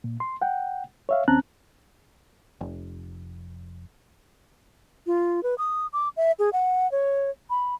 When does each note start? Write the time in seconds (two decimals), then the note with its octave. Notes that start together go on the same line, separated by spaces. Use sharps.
0.04 A#2
0.20 C6
0.42 F#5 G5
1.09 C#5 E5 F5
1.28 D#2 C4 C#4 A5 A#5 F#6
2.61 F1
5.07 F4
5.43 B4
5.58 D#6
5.93 D6
6.17 E5
6.39 G#4
6.53 F#5
6.92 C#5
7.50 B5